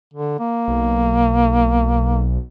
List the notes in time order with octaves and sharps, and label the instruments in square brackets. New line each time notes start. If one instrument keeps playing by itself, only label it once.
[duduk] D3
A#3
[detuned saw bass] B1